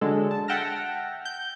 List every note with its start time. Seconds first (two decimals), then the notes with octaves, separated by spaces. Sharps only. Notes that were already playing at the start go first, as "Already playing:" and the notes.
0.01 D3 F#3 G#3 A4
0.31 A5
0.48 E5 F#5 G5 A5 F6 A#6
1.25 G6